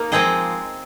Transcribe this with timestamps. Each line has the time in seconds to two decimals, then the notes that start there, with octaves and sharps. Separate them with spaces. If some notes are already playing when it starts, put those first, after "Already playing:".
Already playing: A#3 D#4 A#4
0.12 F3 G#3 C4 G#4 D#5